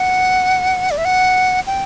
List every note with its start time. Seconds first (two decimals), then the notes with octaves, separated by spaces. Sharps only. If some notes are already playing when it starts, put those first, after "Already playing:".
Already playing: F#5
0.91 D5
0.98 E5
1.05 F#5
1.67 G5